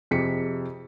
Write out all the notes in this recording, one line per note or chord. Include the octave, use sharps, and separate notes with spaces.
F2 C3 G#4 B6 C#7